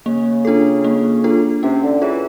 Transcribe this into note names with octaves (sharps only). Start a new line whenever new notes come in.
C#3 A#3
D4 F4 A4
A#3
D4 F4 A4
C3 C#4
D3
E3 F4 G#4 C#5